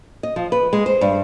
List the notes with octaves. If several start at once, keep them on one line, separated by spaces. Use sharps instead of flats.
D#5
F3
B4
G#3
C5
G2